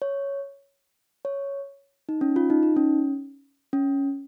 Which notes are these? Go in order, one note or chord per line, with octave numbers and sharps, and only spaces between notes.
C#5
C#5
D#4
C#4
F4
D#4
D#4
C#4
C#4